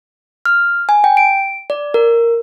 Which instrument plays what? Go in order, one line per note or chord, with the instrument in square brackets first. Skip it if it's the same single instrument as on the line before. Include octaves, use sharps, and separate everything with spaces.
[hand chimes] F6
G#5
G5
D7
D5
A#4